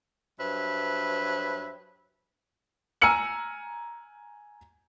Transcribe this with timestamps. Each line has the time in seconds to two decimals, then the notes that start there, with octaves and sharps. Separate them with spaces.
0.39 G2 F#3 B4 C5 E5
3.02 G#5 A#5 E6 F6 C#7 F#7